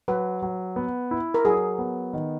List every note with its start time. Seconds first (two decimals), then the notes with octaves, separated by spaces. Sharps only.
0.08 F#3 B4
0.42 F#3
0.76 B3
1.11 E4
1.34 A#4
1.45 F#3 G#4
1.79 B3
2.13 D#3